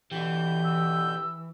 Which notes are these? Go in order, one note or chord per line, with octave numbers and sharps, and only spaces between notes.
B2 D3 E3 G4 G6
E6